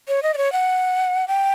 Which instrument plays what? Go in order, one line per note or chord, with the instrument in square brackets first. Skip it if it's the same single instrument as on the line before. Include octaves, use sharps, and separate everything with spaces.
[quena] C#5
D#5
D5
C#5
F#5
G5